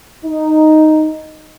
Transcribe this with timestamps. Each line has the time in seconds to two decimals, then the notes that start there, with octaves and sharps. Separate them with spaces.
0.24 D#4